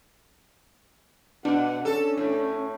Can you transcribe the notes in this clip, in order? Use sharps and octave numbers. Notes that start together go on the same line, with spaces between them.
B2 D4 F#5
C#4 A4
A2